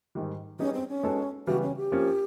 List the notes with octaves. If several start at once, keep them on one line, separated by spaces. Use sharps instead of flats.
G#2 D#3 G3
G3 B3 C#4 D#4 G#4
C4
C#4
G#3 B3 D#4 F#4 A4
C#3 E3 G3 B3 F#4
C#4
G4
F3 A#3 C#4